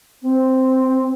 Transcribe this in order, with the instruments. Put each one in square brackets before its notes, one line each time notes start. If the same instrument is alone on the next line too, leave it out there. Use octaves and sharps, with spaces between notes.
[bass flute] C4